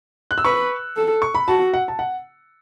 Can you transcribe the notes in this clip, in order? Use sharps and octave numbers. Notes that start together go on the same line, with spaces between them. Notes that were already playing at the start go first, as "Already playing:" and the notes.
F#6
E6
B4 C#6
A4
C#6
B5
F#4 A5
F#5
A5
F#5